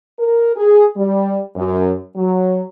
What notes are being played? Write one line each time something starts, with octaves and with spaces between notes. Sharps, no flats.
A#4
G#4
G3
F#2
F#3